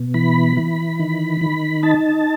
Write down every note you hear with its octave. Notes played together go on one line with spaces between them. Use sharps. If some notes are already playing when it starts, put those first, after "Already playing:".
Already playing: B2
E3 B5
E3
D#3
D#3
D#4 A5